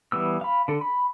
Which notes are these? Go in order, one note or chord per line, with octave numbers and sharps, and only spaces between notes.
E3 G3 B3 E6
F5 B5
D3 A4
B5